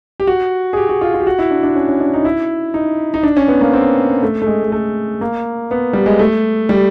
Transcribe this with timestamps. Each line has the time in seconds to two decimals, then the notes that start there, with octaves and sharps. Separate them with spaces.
0.20 G4
0.27 F#4
0.73 G#4
0.77 G4
0.89 F#4
1.01 F4
1.14 F4
1.20 G4
1.27 F#4
1.39 E4
1.51 D4
1.63 D4
1.75 C#4
1.88 C#4
2.00 D4
2.14 D#4
2.25 E4
2.74 D#4
3.14 D#4
3.23 D4
3.37 C#4
3.48 B3
3.61 A#3
3.73 C4
4.22 A3
4.42 A3
4.47 G#3
4.64 G#3
4.72 A3
5.21 A#3
5.71 B3
5.93 G3
6.06 G#3
6.19 A3
6.69 G3